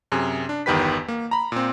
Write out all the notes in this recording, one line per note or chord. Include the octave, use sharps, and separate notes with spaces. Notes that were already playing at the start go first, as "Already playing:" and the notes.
F#2 C3 G#4
D4
G1 E2 D#3 G4 B4 B6
A#3
A#5 B5
A#2 C4